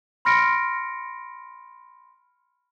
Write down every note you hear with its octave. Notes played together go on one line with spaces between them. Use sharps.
B5 C6 F6 A#6 C#7 D7